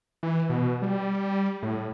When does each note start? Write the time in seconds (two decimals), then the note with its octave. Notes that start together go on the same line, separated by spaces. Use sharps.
0.23 E3
0.49 B2
0.82 G3
1.63 A2